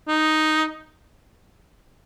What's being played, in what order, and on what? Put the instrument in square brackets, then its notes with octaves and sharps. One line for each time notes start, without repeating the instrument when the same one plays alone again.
[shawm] D#4